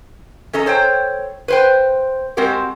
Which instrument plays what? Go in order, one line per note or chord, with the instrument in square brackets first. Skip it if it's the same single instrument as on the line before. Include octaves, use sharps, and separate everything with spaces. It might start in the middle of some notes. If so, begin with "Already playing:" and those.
[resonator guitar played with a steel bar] C#4 A4 D#5 A#5
A4 C5 C#5 G5
B4 C5 G5
G#3 C4 F#4 G4 A#4